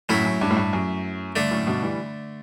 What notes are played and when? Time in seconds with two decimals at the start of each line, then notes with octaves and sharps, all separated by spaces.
0.09 F#2 A2 F#3 A3 E4
0.25 F#2
0.41 G2
0.50 A2
0.57 G2
0.73 F#2
1.36 G2 D3 A3 D4
1.51 F#2 A2
1.67 G2 B2
1.83 E3 G3